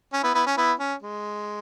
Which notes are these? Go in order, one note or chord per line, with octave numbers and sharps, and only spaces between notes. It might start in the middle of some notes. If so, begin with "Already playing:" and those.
C#4
B3 E4
B3 E4
C#4
B3 E4
C#4
G#3